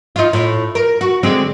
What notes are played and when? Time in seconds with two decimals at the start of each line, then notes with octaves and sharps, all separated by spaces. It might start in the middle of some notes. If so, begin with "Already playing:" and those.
0.16 D#4 F4
0.33 A2
0.75 A#4
1.01 F#4
1.23 D3 G#3 C4